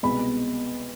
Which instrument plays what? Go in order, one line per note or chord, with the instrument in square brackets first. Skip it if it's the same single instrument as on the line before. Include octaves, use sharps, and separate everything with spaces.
[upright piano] C2 B2 G#3 B3 B5